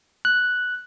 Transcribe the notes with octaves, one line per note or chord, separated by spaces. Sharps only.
F#6